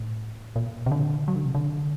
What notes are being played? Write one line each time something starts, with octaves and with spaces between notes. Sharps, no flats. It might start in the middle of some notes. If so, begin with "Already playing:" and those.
Already playing: A2
A#2
C3
D3
F#3
D3
C3
D3